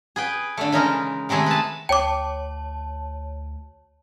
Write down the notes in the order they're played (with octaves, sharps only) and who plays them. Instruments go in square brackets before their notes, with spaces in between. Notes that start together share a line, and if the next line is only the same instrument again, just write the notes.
[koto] G#4 B4 G5
D3 A3
C#3 E3 G#3 D#4 A#4
C3 D#3 G#3 A3 G#4
B4 A5
[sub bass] D2 [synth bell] C#5 A5 [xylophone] G5 D6